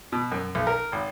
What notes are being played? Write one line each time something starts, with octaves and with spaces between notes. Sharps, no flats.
B2
F#2
B1
A#4
G#1